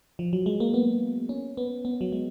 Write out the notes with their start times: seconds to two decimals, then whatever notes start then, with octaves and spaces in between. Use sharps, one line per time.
0.19 F3
0.33 F#3
0.46 G#3
0.60 A#3
0.74 B3
1.29 C#4
1.57 B3
1.85 B3
2.01 F#3
2.12 G#3